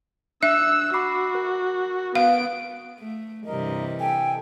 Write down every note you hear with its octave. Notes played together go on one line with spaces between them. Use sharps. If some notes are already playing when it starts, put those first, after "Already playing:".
D4 E5 E6 F#6
F#4 B5 D6 C7
A#4
B3 F5 D7
A3
G2 C3 E3 G3 A#4 D#5
A4 G5 G#5